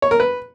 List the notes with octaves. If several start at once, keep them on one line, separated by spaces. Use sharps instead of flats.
C#5
A#4
B4